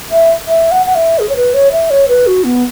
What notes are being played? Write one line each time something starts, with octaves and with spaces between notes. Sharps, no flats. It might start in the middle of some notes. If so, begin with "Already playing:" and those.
E5
E5
F#5
F#5
E5
G#4
C#5
B4
C#5
E5
C#5
B4
F#4
B3